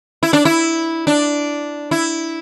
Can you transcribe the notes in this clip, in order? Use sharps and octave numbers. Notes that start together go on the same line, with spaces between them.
E4
D4
E4
D4
E4